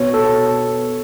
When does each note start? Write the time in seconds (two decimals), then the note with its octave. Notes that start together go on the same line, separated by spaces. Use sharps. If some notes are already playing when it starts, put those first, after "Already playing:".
Already playing: B2 C#5
0.14 A4